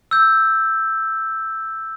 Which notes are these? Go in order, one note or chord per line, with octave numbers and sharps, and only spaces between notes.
E6 G6